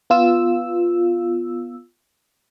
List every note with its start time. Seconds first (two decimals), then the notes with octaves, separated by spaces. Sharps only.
0.10 B3 F4 E6